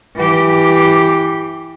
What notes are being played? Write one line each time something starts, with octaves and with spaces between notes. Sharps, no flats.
E3 G4